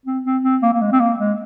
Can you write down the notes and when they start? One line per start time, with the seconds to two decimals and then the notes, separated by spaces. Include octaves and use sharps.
0.06 C4
0.24 C4
0.43 C4
0.63 A#3
0.73 A#3
0.81 G#3
0.92 C4
1.00 A#3
1.19 G#3